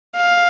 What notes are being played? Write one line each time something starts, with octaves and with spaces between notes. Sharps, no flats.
F5